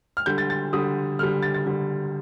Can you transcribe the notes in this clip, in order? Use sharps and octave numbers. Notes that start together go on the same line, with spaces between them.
F6
D3 G3 G6
A6
A6
D3 G3 D#6
D3 G3 F6
A6
A6
D3 G3